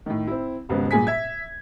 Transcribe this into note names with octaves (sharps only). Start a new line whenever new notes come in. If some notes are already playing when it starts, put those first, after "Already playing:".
A2 D#3
C4 E4
D#1 G#1 G#2 C#3 B3
G2 A#2 G#4 G#5 B6
E5 G#6